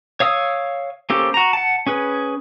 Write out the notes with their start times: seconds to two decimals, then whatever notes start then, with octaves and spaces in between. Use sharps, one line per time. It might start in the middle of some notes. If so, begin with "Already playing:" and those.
0.20 C#5 F5 D#6 E6
1.10 A#3 C#4 G4 A4 C5
1.34 F#4 A#5
1.53 F#5 A5
1.87 C#4 G#4 B4